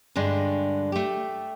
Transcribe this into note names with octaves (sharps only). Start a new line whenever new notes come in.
G2 D3 G#3 D4
A3 G4